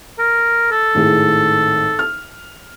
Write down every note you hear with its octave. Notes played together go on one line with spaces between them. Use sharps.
A#4
A4
G#1 A2 G#4
F6